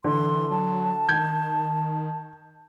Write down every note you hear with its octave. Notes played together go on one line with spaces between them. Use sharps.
D3 E3 C6
F#3 A5
D#3 G6 G#6